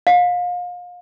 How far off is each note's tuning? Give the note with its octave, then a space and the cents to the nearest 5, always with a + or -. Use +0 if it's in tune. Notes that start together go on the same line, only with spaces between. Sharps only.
F5 +30